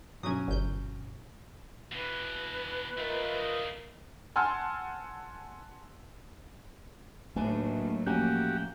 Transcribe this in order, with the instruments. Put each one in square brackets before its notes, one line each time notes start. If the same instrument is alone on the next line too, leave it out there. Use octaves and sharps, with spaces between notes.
[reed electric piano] G2 B2 [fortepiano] F#3 C#4 [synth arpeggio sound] D#6 G#6
[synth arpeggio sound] G1 G6
[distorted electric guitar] B2 E3 [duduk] B4
[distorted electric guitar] A3 C4 [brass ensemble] F4 A#4 D#5
[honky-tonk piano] F#5 G#5 A5 C6 E6 F6
[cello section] D#2 A2 F#3 [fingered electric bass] A3 [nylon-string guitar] D4 B4 G#5
[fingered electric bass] F3 A3 C#4 [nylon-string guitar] A#3 G#5 [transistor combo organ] F#4 G4